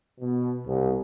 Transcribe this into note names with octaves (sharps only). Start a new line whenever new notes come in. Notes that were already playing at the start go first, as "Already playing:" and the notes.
B2
C2